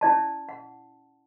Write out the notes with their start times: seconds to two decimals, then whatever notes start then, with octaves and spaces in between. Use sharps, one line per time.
0.01 C#4 E4 D5 A5
0.49 F#5